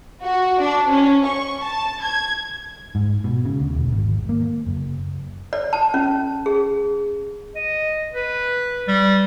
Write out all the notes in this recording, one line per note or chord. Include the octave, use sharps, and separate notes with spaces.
F#4
D4
C#4
C#6
A5
G#6
G#2
B2
C#3
D2
E1
G#1
A#3
F#1
D5
A5
C#4
G#4
D#5
B4
G3